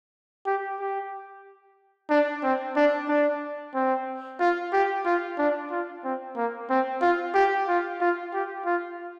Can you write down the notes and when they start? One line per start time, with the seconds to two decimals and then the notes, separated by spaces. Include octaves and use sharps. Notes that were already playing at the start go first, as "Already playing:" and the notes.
0.46 G4
0.79 G4
2.10 D4
2.43 C4
2.76 D4
3.08 D4
3.74 C4
4.40 F4
4.73 G4
5.05 F4
5.38 D4
5.71 F4
6.04 C4
6.36 A#3
6.70 C4
7.01 F4
7.34 G4
7.68 F4
8.01 F4
8.33 G4
8.66 F4